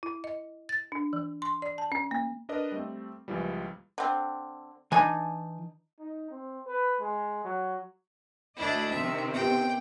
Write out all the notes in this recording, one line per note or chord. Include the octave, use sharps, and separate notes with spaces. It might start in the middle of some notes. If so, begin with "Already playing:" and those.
E4
D#5
A6
D4
E3
C6
D5
A5
C#4
A#3
D4 A#4 B4 D5 D#5
G3 A3 C4
C#2 A#2 E3 F3 G3
D3 C4
E3 D4 D#4 G#5
D#4
C4
B4
G#3
F#3
D2 A3 D4 E4 D#5
C3 D#3 C4 E5
B3 G4 G5